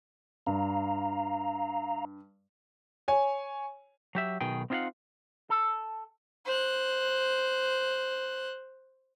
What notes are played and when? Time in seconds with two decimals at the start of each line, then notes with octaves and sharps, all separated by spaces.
0.47 G2 F5 A#5
3.08 C#5 G#5
4.15 F#3 G4 E5
4.41 B1 B2 D#3 G#4 G5
4.70 C4 D#4 F4 C#5 F5 F#5
5.50 A4
6.45 C5 F#6